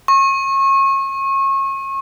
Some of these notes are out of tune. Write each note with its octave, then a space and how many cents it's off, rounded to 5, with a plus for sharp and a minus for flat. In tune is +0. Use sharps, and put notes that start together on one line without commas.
C#6 -30